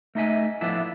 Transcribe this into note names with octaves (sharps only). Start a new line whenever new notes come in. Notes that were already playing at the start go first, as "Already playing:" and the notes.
A3 D#4 D#5 E5 G#5
A2 F3 B3 D4 E4 E5